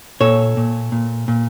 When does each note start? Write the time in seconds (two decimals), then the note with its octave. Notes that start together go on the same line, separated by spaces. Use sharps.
0.20 A#2 A4 C#5
0.57 A#2
0.92 A#2
1.28 A#2